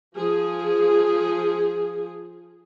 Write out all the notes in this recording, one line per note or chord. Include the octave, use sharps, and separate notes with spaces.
F3 G#4